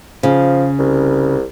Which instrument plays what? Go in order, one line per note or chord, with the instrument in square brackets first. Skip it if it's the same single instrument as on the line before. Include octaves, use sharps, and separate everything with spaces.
[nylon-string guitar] C#3 [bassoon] F3
[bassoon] C2